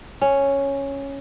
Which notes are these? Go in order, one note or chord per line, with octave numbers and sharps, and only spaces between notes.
C#4